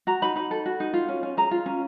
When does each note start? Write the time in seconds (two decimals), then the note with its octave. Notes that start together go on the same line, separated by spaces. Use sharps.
0.07 F#4 A#5
0.22 D#4 B5
0.36 D#4 B5
0.51 A4
0.66 F#4
0.80 D#4
0.94 F4
1.09 C#4
1.23 C#4
1.37 G#4 A#5
1.51 F4
1.66 C#4